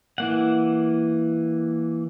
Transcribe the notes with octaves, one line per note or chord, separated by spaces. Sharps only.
E3 A#3 F#5